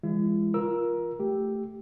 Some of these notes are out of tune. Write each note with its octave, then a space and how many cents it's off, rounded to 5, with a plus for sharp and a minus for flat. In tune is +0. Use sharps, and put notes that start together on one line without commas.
E3 +30 G#3 -20 E4 +45
F4 +0 A#4 +20 E6 +0
A3 +0 G4 +0